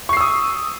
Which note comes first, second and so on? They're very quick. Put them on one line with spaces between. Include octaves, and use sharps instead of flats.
C#6 C7 E6 D#6